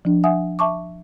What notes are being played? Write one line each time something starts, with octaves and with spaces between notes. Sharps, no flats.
F3 D4
E5 F#5 G#5 D#6
E5 A5 C#6 D6